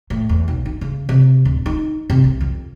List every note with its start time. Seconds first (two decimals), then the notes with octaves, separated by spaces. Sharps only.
0.10 A2
0.29 E2
0.48 B1
0.66 D#4
0.81 C#3
1.09 C3
1.45 D1
1.66 D#4
2.10 C3
2.24 C2
2.41 F2